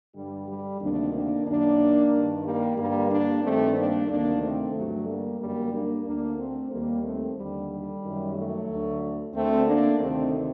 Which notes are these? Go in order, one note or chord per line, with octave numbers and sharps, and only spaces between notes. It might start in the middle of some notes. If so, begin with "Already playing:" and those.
G2 D3 G3
G3
D2 C3 D#3 A#3 D4
A#3 D4
F#2 D#3 A#3 D4
G2 D#3
G3 A#3
G2 D3 G3 A#3
A#3 D4
G2 D#3 A3 C4
A#3 D4
D2 C3 D#3 A#3 D4
A3 C4
G2 D3 F#3 A3
G3 A#3
F#2 D3 G3 A#3
A#3 D4
D2 D3 A#3 D4
A3 C4
D#2 D#3 G3 A#3
A3 C4
D#2 D3 G3
G3
F#2 D#3
F#3 A3
D2 D3
D2 D3 A3 C4
A#3 D4
D2 C3 D#3 A3 C4